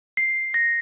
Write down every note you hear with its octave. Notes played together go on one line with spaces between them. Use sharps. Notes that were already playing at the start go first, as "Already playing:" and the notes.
C7
A#6